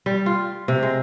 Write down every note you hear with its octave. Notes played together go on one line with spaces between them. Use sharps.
G3
F4
C3
G#3